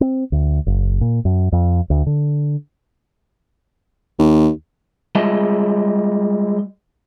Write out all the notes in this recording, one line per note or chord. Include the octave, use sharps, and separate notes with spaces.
C4
D2
F#1
A#2
F#2
F2
D2
D3
D#2
G3 G#3 F4 G#4 D#5 E5